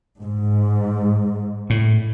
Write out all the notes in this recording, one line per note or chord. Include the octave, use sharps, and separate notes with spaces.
G#2
A2